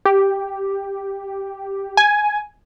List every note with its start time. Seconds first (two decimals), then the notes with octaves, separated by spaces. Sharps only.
0.05 G4
1.97 G#5